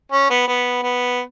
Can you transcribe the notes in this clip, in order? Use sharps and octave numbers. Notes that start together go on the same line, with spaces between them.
C#4
B3
B3
B3